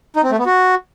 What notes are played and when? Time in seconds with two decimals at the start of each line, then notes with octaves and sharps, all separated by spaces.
0.16 D#4
0.24 C4
0.31 A3
0.38 B3
0.46 F#4